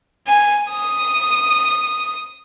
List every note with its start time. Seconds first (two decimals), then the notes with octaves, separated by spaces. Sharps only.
0.26 G#5
0.68 D#6